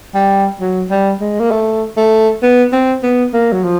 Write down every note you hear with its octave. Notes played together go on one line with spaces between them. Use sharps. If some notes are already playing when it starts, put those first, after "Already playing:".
G3
F#3
G3
G#3
A#3
A3
A3
B3
C4
B3
A#3
F#3
F3